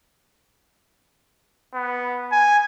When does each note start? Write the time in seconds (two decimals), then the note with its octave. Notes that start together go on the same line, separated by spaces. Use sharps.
1.74 B3
2.32 G#5